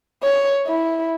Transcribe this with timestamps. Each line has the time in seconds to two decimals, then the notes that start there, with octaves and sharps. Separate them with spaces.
0.23 C#5
0.67 E4